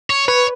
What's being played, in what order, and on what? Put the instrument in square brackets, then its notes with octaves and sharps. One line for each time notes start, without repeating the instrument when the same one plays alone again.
[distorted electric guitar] C#5
[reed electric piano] B4 [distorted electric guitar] C#5